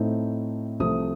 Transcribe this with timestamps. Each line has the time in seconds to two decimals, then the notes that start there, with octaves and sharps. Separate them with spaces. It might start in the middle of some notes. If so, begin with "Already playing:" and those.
Already playing: A2 A3 C4 D#4
0.80 C2 C3 F3 A3 D#6